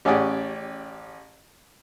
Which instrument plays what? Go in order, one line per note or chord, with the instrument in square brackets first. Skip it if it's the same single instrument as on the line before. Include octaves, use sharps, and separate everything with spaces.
[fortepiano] A1 C#4 G4 G#4 D5 F#5